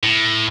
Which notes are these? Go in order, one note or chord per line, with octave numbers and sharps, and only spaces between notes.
A2